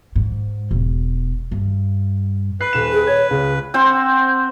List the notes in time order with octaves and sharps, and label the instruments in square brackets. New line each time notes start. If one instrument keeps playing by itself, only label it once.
[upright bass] G#2
E1
G2
[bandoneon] B4 [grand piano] F#6 C7
[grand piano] D#1 E7
[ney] G#4
[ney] C#5 [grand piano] G#6
[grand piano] C#2 [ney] G#4
[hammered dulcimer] C4 C5 F#5